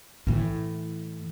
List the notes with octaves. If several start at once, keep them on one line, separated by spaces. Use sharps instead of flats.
A2 E3